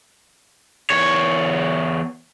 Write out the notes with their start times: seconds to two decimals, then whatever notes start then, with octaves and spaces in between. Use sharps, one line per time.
0.90 E2 C#5